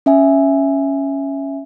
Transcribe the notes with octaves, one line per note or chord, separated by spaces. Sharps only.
C#4 E5 G#5